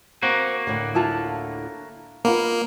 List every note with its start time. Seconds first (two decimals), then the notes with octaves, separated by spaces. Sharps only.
0.23 A#3 C4 F#4
0.67 D2 A2 D3
0.95 E4 F4 A5
2.25 A#3 B3 D#4 F4